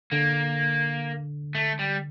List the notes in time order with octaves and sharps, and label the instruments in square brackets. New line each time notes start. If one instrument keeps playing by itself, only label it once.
[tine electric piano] D3 [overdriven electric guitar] A#3
[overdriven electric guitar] A3
G3